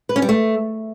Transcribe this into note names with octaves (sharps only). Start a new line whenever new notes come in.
B4
C#4
G3
A3